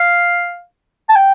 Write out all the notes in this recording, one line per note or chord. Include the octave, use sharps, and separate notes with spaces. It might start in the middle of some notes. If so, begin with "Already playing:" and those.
Already playing: F5
A5
G5